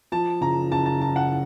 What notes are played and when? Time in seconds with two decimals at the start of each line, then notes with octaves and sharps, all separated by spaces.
0.12 F3 A5
0.41 F#1 A#5
0.71 F#1 A5
0.86 A5
1.00 F3 A5
1.16 F#5